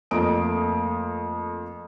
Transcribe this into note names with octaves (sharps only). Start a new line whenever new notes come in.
F2 A3 A#3 A#5 D#6 D7